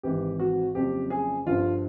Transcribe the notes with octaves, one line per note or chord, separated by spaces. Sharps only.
G#1 G#2 E3 G4
F#4
F#1 F2 C#3 F3 G4
G#4
G1 G2 D3 F3 F4